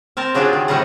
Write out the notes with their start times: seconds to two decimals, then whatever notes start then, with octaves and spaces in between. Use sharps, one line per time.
0.17 C4 A#4 A5
0.34 C#3 F#3 D4 F4 G4 G#4
0.53 D#3
0.68 A2 C3 D#3 G3 D#5 F#5